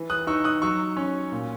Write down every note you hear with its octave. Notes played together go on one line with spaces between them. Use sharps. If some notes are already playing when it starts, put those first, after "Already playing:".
Already playing: E3
D#6 F#6
D#4 C#6 E6
D#6 F#6
F#3 C#6 E6
C#4
A#2